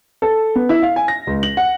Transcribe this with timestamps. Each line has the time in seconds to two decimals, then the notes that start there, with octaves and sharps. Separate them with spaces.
0.22 A4
0.55 B3
0.69 E4
0.82 F5
0.96 G#5
1.08 A#6
1.27 C#2
1.43 F#7
1.57 F#5